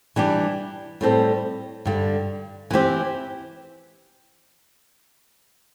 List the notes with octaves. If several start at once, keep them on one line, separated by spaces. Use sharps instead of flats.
E3 G3 D4 G4
A2 G3 C4 A4
G2 D3 G3
E3 C4 G4